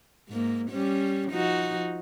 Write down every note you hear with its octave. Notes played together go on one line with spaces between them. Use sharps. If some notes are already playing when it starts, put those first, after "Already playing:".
G#2 A#3
G3 C#4
F3 D#4 F#4